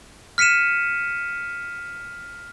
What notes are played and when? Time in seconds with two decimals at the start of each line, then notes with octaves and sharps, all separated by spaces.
0.38 F6 B6 C#7 D#7 E7